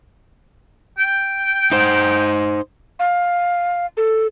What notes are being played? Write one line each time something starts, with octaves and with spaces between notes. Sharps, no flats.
G5
D#4 C5
F5
A4